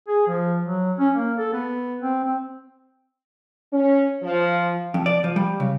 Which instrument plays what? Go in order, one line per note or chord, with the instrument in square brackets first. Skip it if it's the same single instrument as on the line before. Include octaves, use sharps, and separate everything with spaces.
[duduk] G#4
F3
F#3
C#4
A#3
A4
B3
C4
C4
[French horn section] C#4
F3
[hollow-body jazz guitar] F2
D5
F3
G3
C#3